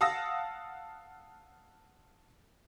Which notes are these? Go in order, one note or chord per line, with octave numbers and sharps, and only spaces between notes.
F5 F#5 A5 D#6 E6 A#6